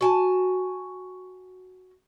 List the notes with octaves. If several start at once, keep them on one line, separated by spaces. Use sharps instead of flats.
F#4 G#5 A5